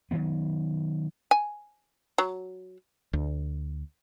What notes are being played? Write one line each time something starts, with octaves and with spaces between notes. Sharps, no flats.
D#3 E3 F#3 B3
G#5
F#3
D2